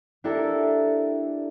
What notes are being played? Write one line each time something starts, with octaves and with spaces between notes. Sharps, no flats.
D4 E4 G4 A4 A#4